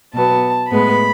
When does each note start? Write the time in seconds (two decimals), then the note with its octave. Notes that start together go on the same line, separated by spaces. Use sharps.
0.13 B2 F#3 B3 A5
0.71 A2 G#3 B3 B5